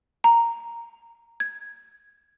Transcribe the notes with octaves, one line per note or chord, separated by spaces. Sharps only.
A#5
G#6